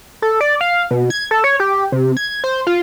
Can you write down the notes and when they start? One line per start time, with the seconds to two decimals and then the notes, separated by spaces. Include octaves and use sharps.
0.22 A4
0.41 D5
0.61 F5
0.91 B2
1.10 G#6
1.31 A4
1.44 C#5
1.60 G4
1.92 C3
2.17 G#6
2.44 C5
2.67 F4